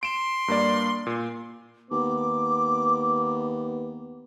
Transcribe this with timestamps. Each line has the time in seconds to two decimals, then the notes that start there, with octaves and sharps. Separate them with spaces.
0.03 C6 D7 E7
0.48 G2 A#3 D5
1.07 A#2
1.91 D#2 B3 D6